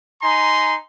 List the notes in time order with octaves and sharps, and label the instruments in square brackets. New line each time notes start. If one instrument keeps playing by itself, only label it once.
[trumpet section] D#4 G#5 A#5 C6